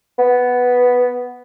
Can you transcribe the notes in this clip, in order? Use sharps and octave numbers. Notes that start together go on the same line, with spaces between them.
B3